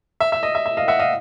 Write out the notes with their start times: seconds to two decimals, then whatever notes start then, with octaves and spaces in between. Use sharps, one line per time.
0.20 E5
0.32 E5
0.43 D#5
0.55 E5
0.66 E5
0.77 D#5 F5
0.88 E5 F#5
0.99 D#5 F5